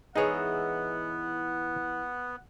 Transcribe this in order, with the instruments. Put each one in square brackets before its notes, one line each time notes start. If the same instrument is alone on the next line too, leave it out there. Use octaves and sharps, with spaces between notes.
[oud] E3 G#3 [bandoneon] B3 [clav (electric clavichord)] D#4 G#4 C#5 [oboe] F#5